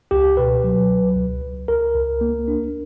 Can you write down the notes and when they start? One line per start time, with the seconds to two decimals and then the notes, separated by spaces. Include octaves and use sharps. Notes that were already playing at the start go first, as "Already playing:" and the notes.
0.11 C#2 G4
0.37 B2 B4
0.64 F#3
0.90 C#2
1.16 C#2
1.42 C#2
1.68 C#2 A#4
1.95 C#2
2.21 A#3
2.48 D4